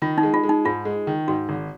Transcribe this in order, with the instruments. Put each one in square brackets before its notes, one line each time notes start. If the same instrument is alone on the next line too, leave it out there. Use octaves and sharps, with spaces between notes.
[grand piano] D#3 [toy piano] F4
[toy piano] D#4
[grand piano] G#3
[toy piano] F4
[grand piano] G#3
[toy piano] D#4
[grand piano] G#2 [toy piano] F4
[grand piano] G#3
D#3
[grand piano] G#2 [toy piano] F#4
[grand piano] G#1